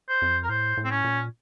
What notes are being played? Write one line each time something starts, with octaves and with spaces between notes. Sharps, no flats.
C5
F2
A#4
A2 C5
A2
C4
C#4
A#2